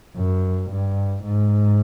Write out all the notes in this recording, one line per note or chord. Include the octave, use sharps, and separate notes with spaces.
F#2
G2
G#2